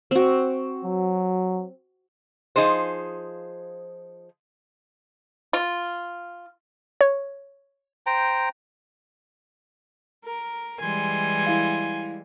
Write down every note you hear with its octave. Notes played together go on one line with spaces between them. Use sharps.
C4 F#4
F#3
F3 D#4 G#4 C5
F4
C#5
C5 G5 A#5
A#4
E3 G3 G#3 G#5 C6
E4 F5